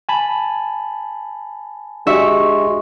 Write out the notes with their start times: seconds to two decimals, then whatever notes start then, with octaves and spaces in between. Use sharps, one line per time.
0.09 G#5 A5 B5
2.07 G#3 D4 F#4 G4 E5 C#6